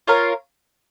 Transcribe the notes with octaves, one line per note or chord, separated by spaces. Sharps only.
F4 A#4 C#5 F5